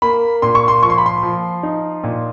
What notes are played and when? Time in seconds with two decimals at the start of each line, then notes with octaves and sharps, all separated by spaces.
0.02 A#3 B5
0.42 A#2 C6
0.55 C#6
0.68 C6
0.83 F3 C#6
0.90 C6
0.98 B5
1.06 C6
1.23 F3
1.63 D#4
2.04 A#2